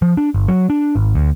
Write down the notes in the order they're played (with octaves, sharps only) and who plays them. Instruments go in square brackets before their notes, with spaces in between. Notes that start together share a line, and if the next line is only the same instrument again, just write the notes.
[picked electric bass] F3
D4
G1
F#3
D4
G#1
D2